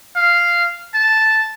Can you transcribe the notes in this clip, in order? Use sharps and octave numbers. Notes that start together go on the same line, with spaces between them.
F5
A5